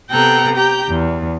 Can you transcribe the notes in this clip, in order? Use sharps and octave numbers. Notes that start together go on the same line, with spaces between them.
C3 B3 A4 G5 A#5 F#6
G4 G5 A#5 G6
E2